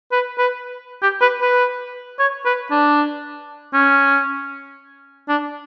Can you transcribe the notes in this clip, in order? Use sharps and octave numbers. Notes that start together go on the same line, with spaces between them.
B4
B4
G4
B4
B4
C#5
B4
D4
C#4
D4